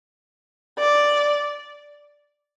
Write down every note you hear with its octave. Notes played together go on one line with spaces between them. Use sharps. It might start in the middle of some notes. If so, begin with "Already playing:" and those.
D5